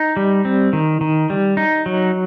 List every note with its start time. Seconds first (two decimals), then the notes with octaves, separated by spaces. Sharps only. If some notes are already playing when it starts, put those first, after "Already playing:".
Already playing: D#4
0.17 G3
0.45 C4
0.73 D#3
1.01 D#3
1.30 G3
1.57 D#4
1.86 F#3